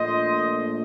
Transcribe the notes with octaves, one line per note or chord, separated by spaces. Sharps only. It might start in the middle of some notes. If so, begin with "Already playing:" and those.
Already playing: A#1 A#2 A3 C5 D#5